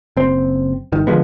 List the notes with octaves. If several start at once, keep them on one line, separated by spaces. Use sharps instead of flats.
F#1 C4
G1 D#3
D3 F3 G#3 B3